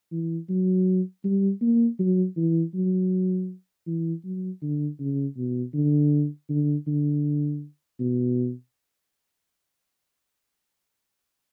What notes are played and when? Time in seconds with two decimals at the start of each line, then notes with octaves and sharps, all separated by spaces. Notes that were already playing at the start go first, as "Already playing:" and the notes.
0.12 E3
0.49 F#3
1.24 G3
1.61 A#3
1.99 F#3
2.37 E3
2.74 F#3
3.87 E3
4.24 F#3
4.62 D3
5.00 C#3
5.37 B2
5.74 D3
6.50 D3
6.87 D3
8.00 B2